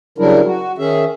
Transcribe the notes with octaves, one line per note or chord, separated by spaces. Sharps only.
C#3 F#3 G3 D4 E4 A#4
F#4
D#3 C#4 G#4 E5